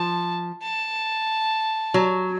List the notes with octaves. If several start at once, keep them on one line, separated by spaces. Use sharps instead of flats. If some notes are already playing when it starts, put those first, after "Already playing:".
Already playing: F3 A5
A5
F#3